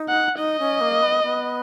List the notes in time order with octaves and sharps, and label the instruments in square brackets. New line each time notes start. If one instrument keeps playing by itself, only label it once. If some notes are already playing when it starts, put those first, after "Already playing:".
Already playing: [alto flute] D#4
[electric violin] F#5
[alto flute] D#4 [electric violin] D#5
[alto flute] C#4
A#3
B3
B3